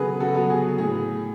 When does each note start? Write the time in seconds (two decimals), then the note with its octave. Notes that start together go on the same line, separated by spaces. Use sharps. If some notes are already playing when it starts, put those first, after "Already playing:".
Already playing: C#3 F#3 B3 G#4 A4 B4
0.20 F#4 A4
0.35 F#3 B3
0.50 G#4
0.78 A2 G#4